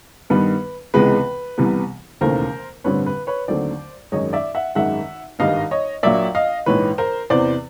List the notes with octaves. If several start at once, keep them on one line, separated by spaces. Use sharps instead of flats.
G2 D#3 G3 B3 B4
C#2 C3 E3 G#3 B3 B4
C2 C3 E3 G3 B3
E1 D#2 C#3 E3 A3 A#4 C5
A1 G2 D3 G3 C4 B4 C#5
B4
B4 C#5
D#2 D3 F#3 A3 C4 C5 D5
G#1 F#2 D#3 G#3 C#5 D#5
D5 E5
E5 F#5
G#1 F#2 D#3 G#3 E5 F#5
G#1 G2 D#3 G3 D#5 F5
C#5 D#5
A#1 A#2 F#3 A#3 D5 E5
D#5 F5
A#1 G#2 E3 B4 C#5
A#4 C5
E2 C3 E3 C5 D5